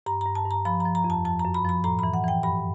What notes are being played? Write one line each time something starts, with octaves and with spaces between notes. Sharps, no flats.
G2 A#5
A#5
G2
A5
G2
A#5
F3 B5
F3 A#5
A#5
F2
A5
F3 A5
A#5
F#2
B5
F3 B5
A2 A#5
E3 B5
F#5
E3 G5
G2 B5